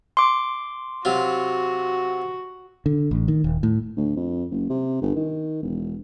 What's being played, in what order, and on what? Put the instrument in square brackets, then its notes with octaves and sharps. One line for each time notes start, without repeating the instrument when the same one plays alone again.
[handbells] C6 D6
[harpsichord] C3 F#3 F4 [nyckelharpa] F#4
[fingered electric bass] D3
A1
D#3
D#1
A2
[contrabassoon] D2
F2
F#1
C3
G1
D#3
E1